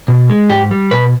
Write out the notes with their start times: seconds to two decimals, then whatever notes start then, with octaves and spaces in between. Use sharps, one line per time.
0.08 B2
0.30 G#3
0.49 G#2 G4
0.71 G3
0.91 B2 B4